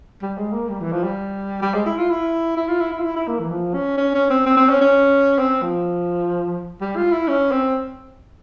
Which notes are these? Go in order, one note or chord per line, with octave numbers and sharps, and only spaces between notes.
G3
G#3
A#3
G3
E3
F3
G3
G3
G#3
E4
F4
E4
E4
F4
E4
E4
F4
E4
E4
A#3
E3
F3
C#4
C#4
C#4
C4
C4
C4
C#4
C#4
C4
F3
G3
F4
E4
C#4
C4